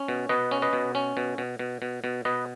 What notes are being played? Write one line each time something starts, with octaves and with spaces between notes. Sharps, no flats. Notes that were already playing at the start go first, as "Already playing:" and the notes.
Already playing: C#4
B2
B2 B4 D#5
C#4
B4 D#5
B2
C#4
B2
B2
B2
B2
B2
B2 B4 D#5